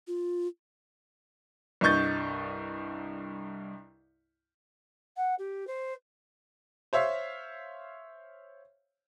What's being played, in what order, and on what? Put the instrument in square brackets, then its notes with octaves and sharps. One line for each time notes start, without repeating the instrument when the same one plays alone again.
[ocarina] F4
[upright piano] C2 G2 D#5 C#6 G6 A6
[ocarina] F#5
G4
C5
[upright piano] C5 C#5 E5 F5